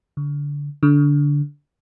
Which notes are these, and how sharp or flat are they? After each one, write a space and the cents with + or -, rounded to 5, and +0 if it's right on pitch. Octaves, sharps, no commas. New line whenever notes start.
D3 -25
D3 -15